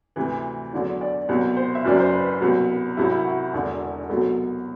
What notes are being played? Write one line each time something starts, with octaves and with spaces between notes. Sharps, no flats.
D2 C3 E3
E2 D3 F#3
D5
C2 B2 F#3
C5
E5
F#1 F#2 F#3 D5
C5
B4
C2 B2 F#3
C2 C3 F#3 E4
E4
F#4
E1 E2 D3
C2 B2 F#3 A4